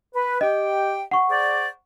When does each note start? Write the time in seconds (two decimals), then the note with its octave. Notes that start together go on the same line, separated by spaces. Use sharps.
0.14 B4
0.41 G4 D#5 G5
1.11 F#5 C#6
1.29 G#4 C5 D5